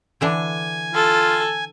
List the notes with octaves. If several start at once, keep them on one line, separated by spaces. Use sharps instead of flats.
D3 E3 D4 G#5 G#6
F4 A4